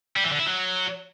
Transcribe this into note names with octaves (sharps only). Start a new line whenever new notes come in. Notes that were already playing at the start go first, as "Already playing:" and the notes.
G3
E3
D3
E4
F#3